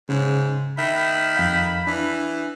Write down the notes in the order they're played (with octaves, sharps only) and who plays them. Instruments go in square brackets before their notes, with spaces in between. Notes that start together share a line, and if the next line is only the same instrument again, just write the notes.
[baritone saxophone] G#2 [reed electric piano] C#3
[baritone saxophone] D#3 [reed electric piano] E5 [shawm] B5
[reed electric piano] F2 F5 G6
[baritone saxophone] E3 [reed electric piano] D4